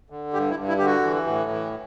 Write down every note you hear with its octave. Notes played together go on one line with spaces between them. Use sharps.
D3
G2 G4
E4
G2
E4
D3 G4
F#4
E3
A2
E3